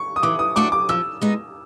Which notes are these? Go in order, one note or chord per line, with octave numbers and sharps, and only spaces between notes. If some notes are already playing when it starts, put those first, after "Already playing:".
Already playing: C#6
D#6
E3 D6
D#6
A3 D4 F#4 D6
D6
F3 E6
G#3 B3 D#4